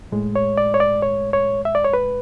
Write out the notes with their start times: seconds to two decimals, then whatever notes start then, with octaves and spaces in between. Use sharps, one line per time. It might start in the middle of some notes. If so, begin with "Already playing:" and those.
0.12 A2 G#3
0.36 C#5
0.58 D5
0.74 C#5
0.80 D5
1.02 C#5
1.33 C#5
1.65 E5
1.75 D5
1.84 C#5
1.94 B4